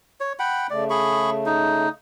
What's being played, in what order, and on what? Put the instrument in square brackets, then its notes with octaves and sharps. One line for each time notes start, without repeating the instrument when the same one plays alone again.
[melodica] C#5
F#5 G5 B5
[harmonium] C#3 A3 [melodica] D5
[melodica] G#4 B5 C#6
D#4